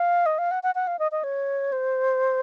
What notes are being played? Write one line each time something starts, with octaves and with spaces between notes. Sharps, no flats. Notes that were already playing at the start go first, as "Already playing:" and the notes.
Already playing: F5
D#5
F5
F#5
F#5
F#5
F5
D#5
D#5
C#5
C5